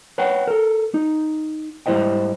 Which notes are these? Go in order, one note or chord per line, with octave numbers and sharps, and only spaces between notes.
B4 C#5 F#5 G5
A4 A#4
D#4
G#2 G3 E4 C5 D#5 G5